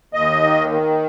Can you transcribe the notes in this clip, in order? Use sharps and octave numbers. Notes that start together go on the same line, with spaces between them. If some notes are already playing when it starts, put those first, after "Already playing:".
D#2 D#5
D#3
D#3